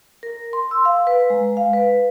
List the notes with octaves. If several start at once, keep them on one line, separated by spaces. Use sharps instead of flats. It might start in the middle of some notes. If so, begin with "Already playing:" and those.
A#4
C6
E6
F5
B4
G#3
F5
B4